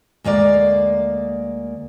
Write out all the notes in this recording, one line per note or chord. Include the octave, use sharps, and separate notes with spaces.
D2 G#3 A#3 D5